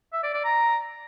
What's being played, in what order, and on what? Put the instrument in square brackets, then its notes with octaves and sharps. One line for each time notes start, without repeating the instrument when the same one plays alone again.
[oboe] E5
D5
D5
A#5